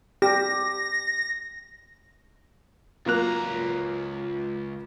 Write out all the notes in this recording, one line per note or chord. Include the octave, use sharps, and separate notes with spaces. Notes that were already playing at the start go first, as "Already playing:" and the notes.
G4 A#6
C#2 F#3 A#3 F4 A#5 F#6